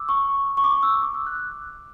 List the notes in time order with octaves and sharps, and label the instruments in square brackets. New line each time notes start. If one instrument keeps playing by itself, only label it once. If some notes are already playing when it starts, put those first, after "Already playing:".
Already playing: [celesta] D6 E6
C#6
C#6
D6
E6
D6
E6
F#6